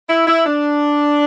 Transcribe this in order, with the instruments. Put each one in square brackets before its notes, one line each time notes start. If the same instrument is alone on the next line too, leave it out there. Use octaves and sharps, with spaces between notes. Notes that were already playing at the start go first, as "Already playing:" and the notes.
[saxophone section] E4
E4
D4